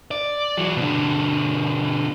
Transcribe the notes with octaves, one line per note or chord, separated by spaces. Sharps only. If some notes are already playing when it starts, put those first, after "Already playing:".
D5
E3 F#3
B2 D3